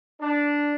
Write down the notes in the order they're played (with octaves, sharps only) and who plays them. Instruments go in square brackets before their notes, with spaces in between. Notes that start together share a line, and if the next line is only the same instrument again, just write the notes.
[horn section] D4